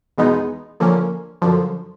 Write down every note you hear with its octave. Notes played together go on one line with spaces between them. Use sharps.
E2 B2 G#3 B3 D#4
D3 F3 A#3 C#4
F#2 D3 F3